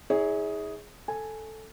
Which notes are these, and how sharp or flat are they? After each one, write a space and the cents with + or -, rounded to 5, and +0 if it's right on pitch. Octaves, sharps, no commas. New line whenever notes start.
E4 -45 G#4 +0 C#5 +20
A4 +0 G#5 +0